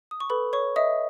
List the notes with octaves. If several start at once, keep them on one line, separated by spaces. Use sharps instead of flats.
D#6
C#6
A4 B4 B5
C#5 C#6
D#5 E5 D#6